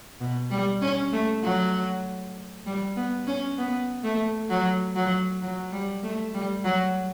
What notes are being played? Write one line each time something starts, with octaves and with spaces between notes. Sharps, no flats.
B2
G3
C#4
A3
F#3
G3
B3
C#4
B3
A3
F#3
F#3
F#3
G3
A3
G3
F#3